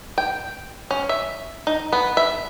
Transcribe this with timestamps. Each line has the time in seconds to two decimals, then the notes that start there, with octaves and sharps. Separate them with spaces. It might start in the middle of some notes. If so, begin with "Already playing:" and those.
0.18 G5
0.91 C#4
1.09 E5
1.67 D#4
1.93 B3
2.17 E5